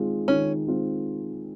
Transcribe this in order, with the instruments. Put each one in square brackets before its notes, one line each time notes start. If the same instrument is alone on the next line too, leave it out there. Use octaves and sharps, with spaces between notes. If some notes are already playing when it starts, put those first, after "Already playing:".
Already playing: [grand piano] D#3 G#3 C4 F4
[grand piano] D#3 [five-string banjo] C#4
[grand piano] G#3 C4 F4